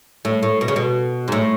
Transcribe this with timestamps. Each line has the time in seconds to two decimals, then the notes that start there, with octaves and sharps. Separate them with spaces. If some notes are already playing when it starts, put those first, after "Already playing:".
0.25 A2
0.43 A2
0.61 B2
0.68 C#3
0.76 B2
1.28 G#2
1.32 A2